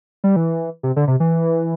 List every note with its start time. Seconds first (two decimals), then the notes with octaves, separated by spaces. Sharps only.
0.24 G3
0.36 E3
0.83 C3
0.96 D3
1.08 C3
1.20 E3